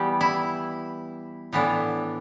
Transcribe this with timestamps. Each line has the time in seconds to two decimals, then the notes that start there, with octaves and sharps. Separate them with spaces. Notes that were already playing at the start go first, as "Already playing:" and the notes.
Already playing: E3 G3 B3 G4
0.21 E4
1.53 A2 E3 B3 D4